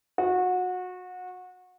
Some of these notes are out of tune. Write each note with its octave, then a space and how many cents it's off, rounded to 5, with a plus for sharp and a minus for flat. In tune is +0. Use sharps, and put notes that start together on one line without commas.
F#4 -25